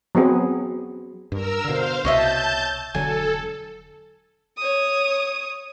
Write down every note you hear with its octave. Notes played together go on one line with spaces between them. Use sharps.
F#3 B3 C4 G#4
G2 A#4 E6
B2 D3 C5 F5
C2 B2 C#5 D#5 E5 A5 G6
E1 D3 F#3 A4 G#5
C#5 D#6